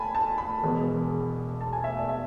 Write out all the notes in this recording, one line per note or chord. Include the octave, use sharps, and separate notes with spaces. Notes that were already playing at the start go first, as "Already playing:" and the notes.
Already playing: G#5 A5 B5
A5
B5
E1 E2 B2 G#3
A5
G#5
E5
D5
E5